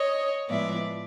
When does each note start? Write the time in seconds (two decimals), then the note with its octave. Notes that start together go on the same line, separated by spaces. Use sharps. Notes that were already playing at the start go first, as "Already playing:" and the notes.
Already playing: C#5 D#5
0.49 A2 F3 G#3 B3 D5 E5